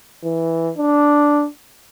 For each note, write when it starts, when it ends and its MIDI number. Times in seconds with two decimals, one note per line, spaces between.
0.24 0.72 52
0.77 1.47 62